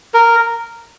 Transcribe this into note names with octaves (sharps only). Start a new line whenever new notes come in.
A#4